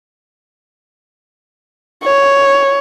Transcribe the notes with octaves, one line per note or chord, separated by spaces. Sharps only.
C#5